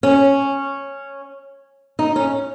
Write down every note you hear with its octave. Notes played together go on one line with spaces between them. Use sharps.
C#4
D#4
C#4